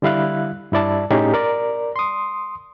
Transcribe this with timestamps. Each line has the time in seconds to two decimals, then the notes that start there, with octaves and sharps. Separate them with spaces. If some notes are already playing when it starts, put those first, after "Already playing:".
0.02 D3 G3 E4 F5 F#6
0.72 G2 E4 D5 A5
1.11 A2 C#4 D#4 G4 G#4
1.34 A#4 D5
1.96 C6 D#6